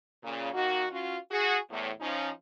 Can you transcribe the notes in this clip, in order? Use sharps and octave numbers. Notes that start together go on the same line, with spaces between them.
A#2 C#3
D#3 A#3 D#4 F#4
C#4 F4 F#4
F#4 G#4
E2 A2
F3 C#4 D#4